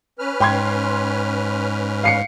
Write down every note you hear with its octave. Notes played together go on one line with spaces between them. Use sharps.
C#4 B4 F6
G#2 G5 C6 G#6
F5 C7 C#7